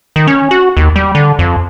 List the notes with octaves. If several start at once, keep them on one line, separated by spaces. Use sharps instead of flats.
D#3
C#4
F#4
D#2
G3
D3
F2